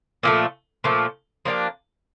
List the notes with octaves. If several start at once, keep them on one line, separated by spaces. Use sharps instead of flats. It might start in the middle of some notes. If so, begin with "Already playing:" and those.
A#2 F3 A3
A#2 F3 A3
F3 A#3 D4 G4